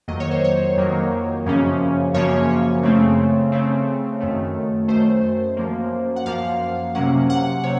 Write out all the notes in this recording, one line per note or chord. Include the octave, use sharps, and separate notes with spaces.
F2 D#3 F#3 A#3 D#5
C#5
C5
C#5
F2 D#3 F#3 A#3
F#2 C#3 F3 A#3 C#4
F#2 C#3 F3 A#3 C#4 C#5
C#3 A3 C4
C#3 A3 C4
F#2 D#3 A3
F#2 D#3 A3 C5
F#2 F3 A#3
F#5
F#2 F3 A#3 F5
C3 F#3 A#3 C#4 F#5
F#5
C3 C#5